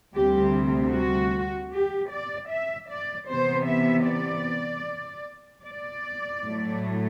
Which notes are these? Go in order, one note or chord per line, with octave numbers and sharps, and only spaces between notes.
D2 C3 G3 C4 G4
F#4
G4
D5
E5
D5
C3 E3 B3 C5
E5
D5
D5
A2 F#3 A3